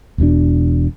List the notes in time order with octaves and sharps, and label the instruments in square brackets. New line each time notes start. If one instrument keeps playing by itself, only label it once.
[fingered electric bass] E1 E2 B2 D4